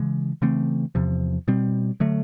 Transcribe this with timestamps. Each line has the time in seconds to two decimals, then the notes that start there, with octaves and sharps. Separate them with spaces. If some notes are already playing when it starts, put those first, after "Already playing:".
Already playing: C#3 E3 G#3
0.42 C#3 E3 A3 C4
0.95 E2 C3 F3
1.48 B2 G3 C4
2.00 D3 F#3 A3